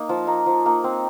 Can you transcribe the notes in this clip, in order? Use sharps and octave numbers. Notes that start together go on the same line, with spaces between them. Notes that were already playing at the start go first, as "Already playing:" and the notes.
Already playing: A#3 D#4
F3
A#3 D#4
F3
A#3 D#4
C4